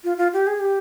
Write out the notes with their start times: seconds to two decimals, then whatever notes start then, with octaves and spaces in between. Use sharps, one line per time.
0.04 F4
0.17 F4
0.33 G4
0.47 G#4
0.60 G4